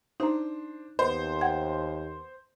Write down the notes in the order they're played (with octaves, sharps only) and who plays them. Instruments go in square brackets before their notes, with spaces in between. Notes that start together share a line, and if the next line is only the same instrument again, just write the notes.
[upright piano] D4 C5 [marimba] D#4 A#5
[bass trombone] D#2 [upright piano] B3 [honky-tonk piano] C5
[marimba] F#5 G5 G#6